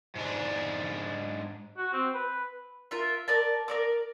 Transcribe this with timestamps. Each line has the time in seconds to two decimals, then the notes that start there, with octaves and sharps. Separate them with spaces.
0.15 G#2 D4
1.77 F#4
1.93 C4
2.14 B4
2.91 F4 A#4 E5
3.28 A#4 D5 A5
3.68 A#4 D5 D6